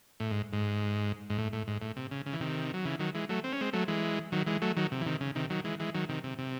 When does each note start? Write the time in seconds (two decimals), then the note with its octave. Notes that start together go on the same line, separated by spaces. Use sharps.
0.20 A2
0.31 G#2
0.53 G#2
1.30 G#2
1.38 A2
1.53 A2
1.68 G#2
1.82 A2
1.96 C3
2.11 C#3
2.26 C#3
2.33 E3
2.41 C3 D#3
2.74 F#3
2.85 C#3 E3
2.99 D#3 F#3
3.15 E3 G#3
3.29 F#3 A3
3.44 C4
3.53 C#4
3.61 G#3 C4
3.73 F#3 A3
3.88 E3 G#3
4.32 D#3 F#3
4.47 E3 G#3
4.62 F#3 A3
4.77 D#3 F#3
4.92 C3
5.01 E3
5.06 C3 D#3
5.21 C#3
5.35 C3 D#3
5.50 D#3 F#3
5.64 E3 G#3
5.80 E3 G#3
5.94 D#3 F#3
6.09 C3 D#3
6.24 C3
6.39 C3